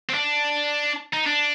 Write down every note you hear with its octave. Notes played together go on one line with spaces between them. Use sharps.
C4
D4
D#4
D4